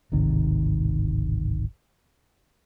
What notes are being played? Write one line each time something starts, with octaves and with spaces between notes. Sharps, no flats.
D1 G#1 C3 D#3